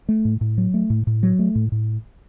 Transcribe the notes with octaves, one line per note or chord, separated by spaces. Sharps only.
A3
A2
A2
F#3
A3
A2
A2
F#3
A3
A2
A2